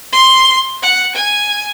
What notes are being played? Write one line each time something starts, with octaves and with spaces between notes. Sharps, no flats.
C6
F#5
G#5